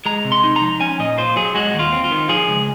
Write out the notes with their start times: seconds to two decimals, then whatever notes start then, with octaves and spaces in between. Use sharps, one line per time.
0.06 G#3 A#5
0.25 C3
0.32 C6
0.44 D#4
0.56 A#5
0.62 F3
0.81 C#4 G#5
0.99 A#2 D#5
1.18 F4 C5
1.36 F#3 G#4
1.55 G#3 F#4
1.74 D#2
1.79 F4
1.92 C4
2.04 F4
2.11 D#3
2.29 F3 G#4
2.48 C#2